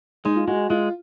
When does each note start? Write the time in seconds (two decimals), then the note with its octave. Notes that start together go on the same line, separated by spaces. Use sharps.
0.25 G#3 D#4
0.36 F4
0.47 G#3 F#4
0.70 G#3 F4